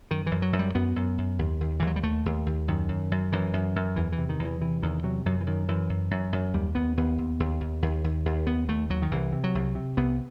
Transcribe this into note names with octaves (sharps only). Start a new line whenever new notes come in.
F#2 D#3
F#2 E3
F#3
F#2
G3
F#2 B3
F#2
F#2
D#2
D#2
D#2 E3
F#3
G3
D#2 A3
D#2
D#2
F#2 D#3
F#2
F#2
F#2 E3
F#2
F#2
E2 E3
E3
C3
D#3
E2
E3
C3 E3
E2 D#3
C3 F#3
F#2 F#3
E3
F#2 D#3
F#2 E3
F#2
F#2
F#2
D#2 G3
D#2 B3
D#2 B3
D#2
D#2
D#2
D#2
D#2
D#2
D#2 B3
D#2 A3
D#2 F#3
D#3
C2 E3
C3
F#3
C2
C3
C2 B3